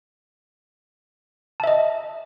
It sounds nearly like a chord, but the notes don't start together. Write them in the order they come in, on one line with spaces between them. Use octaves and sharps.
A5 E5 D#5